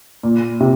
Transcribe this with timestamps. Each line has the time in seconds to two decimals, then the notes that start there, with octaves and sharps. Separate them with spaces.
0.23 A#2
0.60 C3